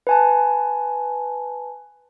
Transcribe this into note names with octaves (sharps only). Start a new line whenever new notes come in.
B4 G#5 A5